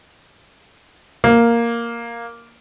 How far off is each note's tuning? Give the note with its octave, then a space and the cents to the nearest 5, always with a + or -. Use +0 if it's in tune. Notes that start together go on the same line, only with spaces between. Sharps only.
A#3 +0